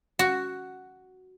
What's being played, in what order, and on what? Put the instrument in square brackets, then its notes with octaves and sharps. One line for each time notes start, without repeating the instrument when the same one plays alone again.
[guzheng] F#4